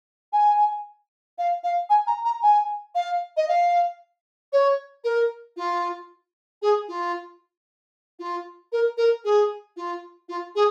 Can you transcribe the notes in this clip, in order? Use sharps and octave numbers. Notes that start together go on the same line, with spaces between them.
G#5
F5
F5
G#5
A#5
A#5
G#5
F5
D#5
F5
C#5
A#4
F4
G#4
F4
F4
A#4
A#4
G#4
F4
F4
G#4